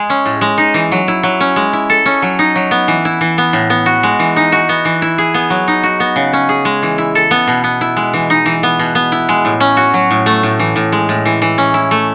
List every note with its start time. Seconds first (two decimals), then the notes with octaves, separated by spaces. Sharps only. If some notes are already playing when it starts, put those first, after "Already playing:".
Already playing: G#3 G#4
0.10 C#4
0.26 A2
0.41 G#3
0.58 D#4
0.74 E3
0.92 F#3
1.08 E4
1.23 F#3
1.40 C#4
1.56 G#3
1.73 E4
1.90 A4
2.06 C#4
2.22 F#3
2.39 D#4
2.55 F#3
2.71 B3
2.88 E3
3.05 E4
3.21 E3
3.38 B3
3.53 A2
3.70 B3
3.86 F#4
4.03 G#3
4.19 E3
4.36 D#4
4.52 F#4
4.69 B3
4.85 E3
5.02 E4
5.18 G#4
5.34 B3
5.50 F#3
5.68 D#4
5.83 F#4
6.00 B3
6.16 C#3
6.33 C#4
6.49 G#4
6.65 G#3
6.83 E3
6.98 E4
7.15 A4
7.31 B3
7.47 B2
7.64 B3
7.81 E4
7.96 G#3
8.13 E3
8.30 D#4
8.46 E3
8.63 B3
8.79 B2
8.95 B3
9.12 E4
9.29 G#3
9.45 A2
9.60 C#4
9.77 F#4
9.94 F#3
10.10 A2
10.26 A3
10.43 A2
10.59 E3
10.76 A2
10.92 G#3
11.09 A2
11.25 E3
11.42 E3
11.58 C#4
11.74 E4
11.91 A3